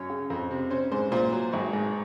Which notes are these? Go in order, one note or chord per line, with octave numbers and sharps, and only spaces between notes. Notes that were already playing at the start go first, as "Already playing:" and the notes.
Already playing: F#2 C#5
C#3
F2
C3
C#4 C5
G#2 C5
A#2 C5
F#3
G#1
G#2